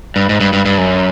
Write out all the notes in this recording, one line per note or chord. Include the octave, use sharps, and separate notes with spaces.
G2
G#2
G2
G2
G2
F#2